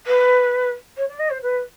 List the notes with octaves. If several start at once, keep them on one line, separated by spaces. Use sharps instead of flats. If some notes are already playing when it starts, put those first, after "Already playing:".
B4
C#5
D5
D#5
C5
B4